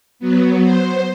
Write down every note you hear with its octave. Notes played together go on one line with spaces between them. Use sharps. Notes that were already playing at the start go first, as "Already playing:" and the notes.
F#3 B3
C5